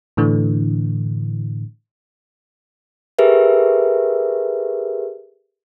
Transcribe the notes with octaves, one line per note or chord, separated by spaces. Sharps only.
A2 D3 E3
G4 G#4 A#4 B4 E5